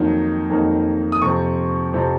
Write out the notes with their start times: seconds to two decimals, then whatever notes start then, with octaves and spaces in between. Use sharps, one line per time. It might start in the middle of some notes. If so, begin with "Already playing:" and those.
Already playing: F2 D#3 F#3 A#3 D#4
0.50 F2 D#3 F#3 A#3 D#4
1.12 D#6
1.22 F2 C3 F3 C4 C#6
1.94 F2 C3 F3 C4